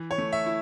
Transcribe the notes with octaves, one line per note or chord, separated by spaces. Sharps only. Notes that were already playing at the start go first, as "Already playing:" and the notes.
Already playing: E3
C#5
A3
E5
E4